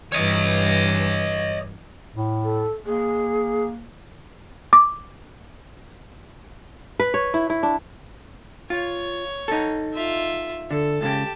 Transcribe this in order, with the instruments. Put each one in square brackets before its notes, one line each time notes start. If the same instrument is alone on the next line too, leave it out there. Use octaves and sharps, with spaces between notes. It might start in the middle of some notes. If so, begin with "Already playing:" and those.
[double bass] G2 E3 [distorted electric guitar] C#5 D#5
[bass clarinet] A2
[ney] A4
[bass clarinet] A#3 [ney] G#4
[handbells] D6
[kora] B4
C#5
E4
E4
D4
[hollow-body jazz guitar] F4 [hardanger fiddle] C#5
[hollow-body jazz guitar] D#4 A4
[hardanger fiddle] F4 E5
[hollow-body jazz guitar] D3 [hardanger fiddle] A4
[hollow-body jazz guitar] C#2 A2 C#3 [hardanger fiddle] G4 A5